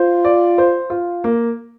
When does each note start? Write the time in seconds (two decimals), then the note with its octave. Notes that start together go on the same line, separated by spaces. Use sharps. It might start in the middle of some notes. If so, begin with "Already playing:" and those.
Already playing: F4 C5
0.25 D5
0.58 C5
0.90 F4
1.24 A#3